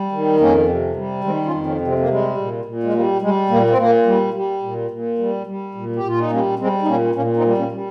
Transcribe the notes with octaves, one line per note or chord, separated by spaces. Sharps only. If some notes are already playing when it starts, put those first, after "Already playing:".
Already playing: G3
D#3
F2 A#3 C#4
C3
G3
D#3 G#3 C4
C#4 F4
F2
A#3 C#4
C3
G#3 C4
A#3
G3 G#3
A#2
A#2
G#3
G3 A#3
G3 G#3
A#2 A#3
C4
A#2 A#3
G3
G3
A#2
A#2
G3
G3
A#2
G4
A#2 F4
D#4
G3 A#3 C#4
G3 G#3 C4
D#4
A#2 A#3 C#4
A#2 A#3 C#4
C4 D#4
G3
A#3 C#4
G3